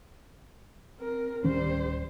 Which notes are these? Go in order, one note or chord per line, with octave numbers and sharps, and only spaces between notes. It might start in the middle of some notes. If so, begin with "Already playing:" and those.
C4 A#4
D1 D#3 G3 C#4 C5